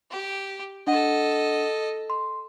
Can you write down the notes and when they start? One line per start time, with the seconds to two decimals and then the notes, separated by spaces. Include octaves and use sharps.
0.11 G4
0.87 D4 A4 D#5 F#5
2.10 C6